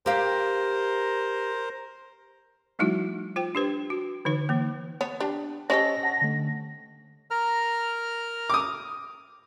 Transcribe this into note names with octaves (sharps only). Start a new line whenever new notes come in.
G4 A#4 C5 F5
F3 G3 A3 D#4 E4 F#4
F4 C5 G5
D4 G4 B4 C5
F#4
D3 E3 D#4 B4
E3 A#3
B3 C#5
D4 G4
C#4 G4 A4 C5 C#5 D#5 A#6
F#5 A5
D3 A3
A#4 A#5 F6
D6 D#6